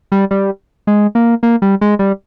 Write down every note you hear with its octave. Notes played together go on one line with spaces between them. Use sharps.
G3
G3
G#3
A#3
A#3
G3
G#3
G3